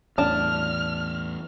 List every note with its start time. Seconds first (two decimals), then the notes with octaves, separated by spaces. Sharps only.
0.18 E2 A2 D4 A5 F6